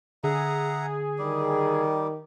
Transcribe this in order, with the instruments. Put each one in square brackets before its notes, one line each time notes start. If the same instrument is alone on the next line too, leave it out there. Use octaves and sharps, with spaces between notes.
[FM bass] D3 [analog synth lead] G#4 [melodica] E5 F#5 A#5
[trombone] D#3 [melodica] G3 G4